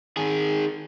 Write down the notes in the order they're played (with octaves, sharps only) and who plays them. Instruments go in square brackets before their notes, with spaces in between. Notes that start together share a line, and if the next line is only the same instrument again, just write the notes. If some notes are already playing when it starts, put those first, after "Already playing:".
[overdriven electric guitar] D#3 G#4